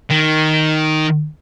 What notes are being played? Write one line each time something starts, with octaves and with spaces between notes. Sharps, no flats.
D#3